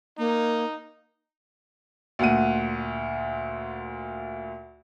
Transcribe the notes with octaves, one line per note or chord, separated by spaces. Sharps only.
A#3 D#4
D2 A#2 F#5 D#7